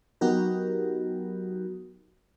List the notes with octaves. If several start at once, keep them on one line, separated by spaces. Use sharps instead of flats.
F#3 B3 D#4 F#4 G4 A#4